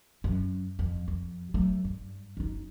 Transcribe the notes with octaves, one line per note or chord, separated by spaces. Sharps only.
F#2
F2
F2
F#3 A3
G2
F#1 D#4